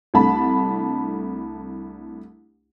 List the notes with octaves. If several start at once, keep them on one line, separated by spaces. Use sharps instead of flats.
C2 A3 D4 A5 B5